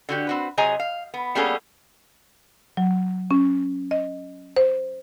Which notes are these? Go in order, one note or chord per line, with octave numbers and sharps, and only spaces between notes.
D3 F#4 G4
C4 F#4 B4
C3 F#3 G#4 D#5 G#5 A#5
F5
B3
G3 A#3 B3 C#4 G#4 A4
F#3
C#4
D#5
C5